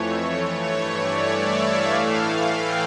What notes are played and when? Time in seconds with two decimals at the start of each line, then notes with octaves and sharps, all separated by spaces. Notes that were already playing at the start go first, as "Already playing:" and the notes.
Already playing: F2 E3 A3 C#5
0.61 G2 E3 A3 C#5
0.94 D5
1.26 E5
1.59 F5
1.91 A2 E3 A3
2.24 F5
2.56 G5